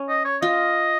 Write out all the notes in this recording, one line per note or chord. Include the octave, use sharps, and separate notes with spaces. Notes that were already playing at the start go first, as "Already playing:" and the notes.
Already playing: C#4
D#5
C#5
F4 D#5